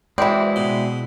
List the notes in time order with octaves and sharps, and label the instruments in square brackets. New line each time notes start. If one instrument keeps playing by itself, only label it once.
[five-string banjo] E3 C4 [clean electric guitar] G#3 E4 [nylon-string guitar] F#4 D5
[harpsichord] B2